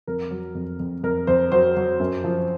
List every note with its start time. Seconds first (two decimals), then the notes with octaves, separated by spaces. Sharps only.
0.07 F2 A#4
0.31 F#3
0.55 F2
0.80 F2
1.03 F2 A#4
1.27 F2 C5
1.52 F#3 C5
1.77 F#3
2.00 F#2
2.24 F3